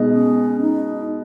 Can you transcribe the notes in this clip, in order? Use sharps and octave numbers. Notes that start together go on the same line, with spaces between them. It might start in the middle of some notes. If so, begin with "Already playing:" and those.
Already playing: B2 G#3 D#4 D#5
C#4
D#4